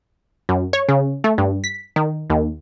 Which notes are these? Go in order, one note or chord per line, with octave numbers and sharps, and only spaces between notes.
F#2
C#5
C#3
A3
G2
B6
D#3
D#2